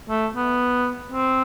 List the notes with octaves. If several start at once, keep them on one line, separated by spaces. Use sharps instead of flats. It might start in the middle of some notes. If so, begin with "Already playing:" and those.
A3
B3
C4